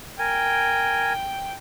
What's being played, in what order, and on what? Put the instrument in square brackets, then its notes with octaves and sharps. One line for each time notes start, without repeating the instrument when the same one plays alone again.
[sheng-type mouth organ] A#4 G#5 [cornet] G5